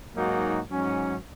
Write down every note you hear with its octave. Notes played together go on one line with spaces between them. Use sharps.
G#2 F#3 A#3 D#4 F#4
G#2 F#3 C#4